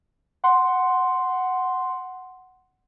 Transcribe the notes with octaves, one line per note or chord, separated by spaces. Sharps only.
F#5 C6